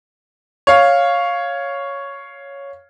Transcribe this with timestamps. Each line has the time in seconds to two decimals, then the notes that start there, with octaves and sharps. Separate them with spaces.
0.67 C#5 F5